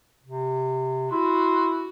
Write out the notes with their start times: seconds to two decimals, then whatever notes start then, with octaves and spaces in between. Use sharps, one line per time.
0.23 C3
1.12 E4 F#4 C6